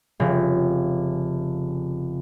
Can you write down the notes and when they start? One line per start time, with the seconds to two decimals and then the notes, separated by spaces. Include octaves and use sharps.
0.20 F1 C#3